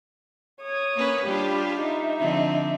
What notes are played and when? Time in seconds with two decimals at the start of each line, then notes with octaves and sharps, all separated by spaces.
0.62 C#5 D#6
0.95 A#3 C#4 B4
1.25 G3 D4 F4 G4 B5
1.81 D#4 E5
2.19 D3 F3 C4